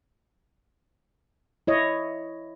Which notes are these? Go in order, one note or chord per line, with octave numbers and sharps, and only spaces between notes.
E4 C#5 D#5